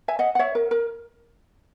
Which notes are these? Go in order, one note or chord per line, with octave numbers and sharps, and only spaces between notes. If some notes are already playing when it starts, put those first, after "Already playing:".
E5 G#5
D#5 F#5
F#5
C#5 E5
A#4
A#4